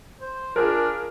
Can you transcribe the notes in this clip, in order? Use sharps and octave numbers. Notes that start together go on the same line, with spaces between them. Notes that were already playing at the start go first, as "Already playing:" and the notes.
C5
D4 F4 G#4 A#4